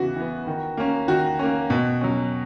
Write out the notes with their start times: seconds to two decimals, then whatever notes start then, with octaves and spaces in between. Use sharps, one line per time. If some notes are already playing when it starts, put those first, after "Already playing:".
Already playing: C#3 E3 B3 F#4
0.16 E3 B3
0.47 D#3
0.77 A#3 C#4
1.08 D#3 F#4
1.39 A#3 C#4
1.70 B2
2.01 F#3 C#4